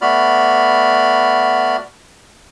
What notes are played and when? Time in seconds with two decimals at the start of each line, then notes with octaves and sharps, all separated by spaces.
0.01 A3 B3 F#4 D5 B5 F6